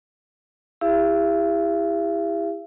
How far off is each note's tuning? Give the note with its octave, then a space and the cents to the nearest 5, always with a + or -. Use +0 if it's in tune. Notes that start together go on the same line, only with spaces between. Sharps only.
E4 +0 G4 +40 E5 +45